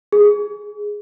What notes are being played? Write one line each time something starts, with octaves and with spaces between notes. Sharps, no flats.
G#4